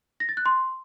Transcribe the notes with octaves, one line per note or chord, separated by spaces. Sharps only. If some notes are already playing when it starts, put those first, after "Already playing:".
A#6
A6
F#6
C6